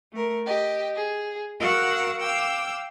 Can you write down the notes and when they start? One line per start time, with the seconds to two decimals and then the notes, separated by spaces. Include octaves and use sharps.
0.11 A3 A#4
0.46 G4 D#5
0.95 G#4
1.58 F#4 A#4 F5 F#5 E6 F#6
2.20 F5 G5 D6 E6